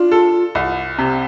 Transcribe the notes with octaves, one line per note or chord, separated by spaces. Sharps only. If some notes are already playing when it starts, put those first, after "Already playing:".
Already playing: D4 F4
A4
C2
C3